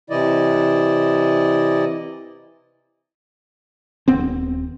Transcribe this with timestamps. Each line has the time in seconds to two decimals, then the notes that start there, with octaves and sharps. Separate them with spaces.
0.10 C3 E3 E4 D5 D#5
4.08 D#1 B3 C4